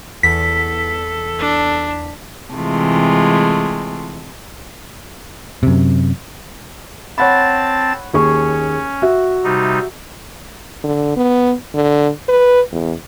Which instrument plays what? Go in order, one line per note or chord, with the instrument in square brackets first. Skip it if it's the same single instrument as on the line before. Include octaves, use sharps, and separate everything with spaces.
[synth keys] E2 [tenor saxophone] A4 [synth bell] B6
[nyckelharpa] D4
[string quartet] C3 E3 G#3 A3 F4
[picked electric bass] F#2 C3
[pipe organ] C4 A5 A6 [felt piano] C#5 F#5 B5
[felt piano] D#2 G#4 C#6 [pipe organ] C#4
[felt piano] F#4 E5
[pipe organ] C3 G3 D#4
[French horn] D3
B3
D3
B4
E2